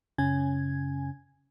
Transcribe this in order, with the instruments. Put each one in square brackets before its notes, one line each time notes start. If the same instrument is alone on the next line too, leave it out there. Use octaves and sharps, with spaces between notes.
[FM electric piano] F#2 C#3 C#4 G#5 G#6